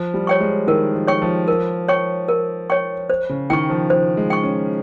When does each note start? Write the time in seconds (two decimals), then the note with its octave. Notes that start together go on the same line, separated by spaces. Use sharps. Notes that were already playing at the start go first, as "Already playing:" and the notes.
Already playing: F3
0.14 G3
0.27 C#5 G5 C#6
0.40 G#3
0.67 D#3 A#4
0.94 F3
1.07 C#5 G5 C#6
1.22 F3
1.48 A#4
1.88 C#5 G5 C#6
2.28 A#4
2.70 C#5 G5 C#6
3.10 C5
3.29 C#3
3.50 D#3 G5 C#6
3.70 F3
3.90 F3 C5
4.17 G#3
4.30 G5 C#6
4.43 C#4